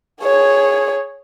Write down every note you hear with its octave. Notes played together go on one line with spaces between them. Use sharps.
G#4 C#5